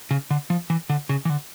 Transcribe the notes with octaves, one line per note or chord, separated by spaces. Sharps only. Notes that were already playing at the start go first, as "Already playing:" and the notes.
C#3
D3
F3
E3
D3
C#3
E3
D3